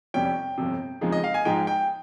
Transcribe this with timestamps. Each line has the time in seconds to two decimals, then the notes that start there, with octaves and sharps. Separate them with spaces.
0.14 F1 F2 C3 G3 C#4 G5
0.58 G1 F2 C3
1.01 F2 C#3 F3 G#3 D#4
1.12 D#5
1.24 F5
1.34 G#5
1.45 G#2 F3 G#3 D#4 G5
1.67 G5